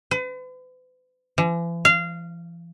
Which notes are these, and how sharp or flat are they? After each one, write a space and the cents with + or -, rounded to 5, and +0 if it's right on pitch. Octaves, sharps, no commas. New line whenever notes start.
B4 +45
E3 +45
F5 -20